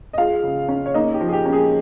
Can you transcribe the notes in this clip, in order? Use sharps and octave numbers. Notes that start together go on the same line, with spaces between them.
D#5
G#3 F4 F5
C#3
C#4
C#5
A#3 D#4 D#5
G4
F3
G#4
G4
C#4
G#3 G#4